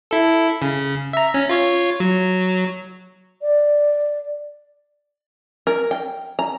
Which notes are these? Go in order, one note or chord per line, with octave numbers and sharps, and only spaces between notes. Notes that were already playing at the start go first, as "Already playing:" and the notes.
E4 A4
C#3
E5 A#5
C#4
F4 C#5
F#3
D5
A#4
G5
A#5